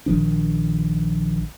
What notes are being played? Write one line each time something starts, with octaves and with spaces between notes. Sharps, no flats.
A#1 D#3 F3 D4